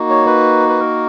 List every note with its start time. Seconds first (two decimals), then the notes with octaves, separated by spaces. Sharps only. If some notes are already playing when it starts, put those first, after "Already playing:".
Already playing: A#3 D#4 F#4
0.10 C#5
0.27 B4
0.69 B4
0.80 A#4